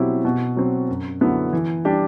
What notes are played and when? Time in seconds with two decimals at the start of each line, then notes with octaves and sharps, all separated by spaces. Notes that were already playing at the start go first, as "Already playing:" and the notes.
Already playing: B2 F#3 C4 E4 G4
0.25 B2
0.57 F#3 C4
0.89 F#2
1.21 D3 F#3 B3 E4
1.53 E3
1.85 G3 D4 G4